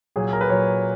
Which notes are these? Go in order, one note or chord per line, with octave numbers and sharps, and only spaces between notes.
A#2 F#3 G#4
A#4
B4
A#2 F#3 C#5